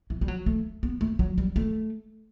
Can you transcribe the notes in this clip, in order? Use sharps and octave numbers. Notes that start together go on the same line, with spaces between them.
E3
G3
F#3
A3
B3
A3
F#3
G3
A3